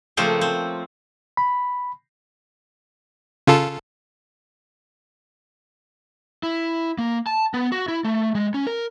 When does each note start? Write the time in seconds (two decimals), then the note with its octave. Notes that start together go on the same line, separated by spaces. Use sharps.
0.17 C#3 F3 A3 A#3 C4
0.41 C4
1.37 B5
3.47 C#3 F4 A4
6.43 E4
6.98 A#3
7.27 A5
7.54 B3
7.72 F#4
7.88 E4
8.05 A3
8.35 G#3
8.54 C#4
8.67 A#4